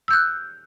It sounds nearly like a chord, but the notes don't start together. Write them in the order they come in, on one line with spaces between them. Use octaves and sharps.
E6 G6 F#6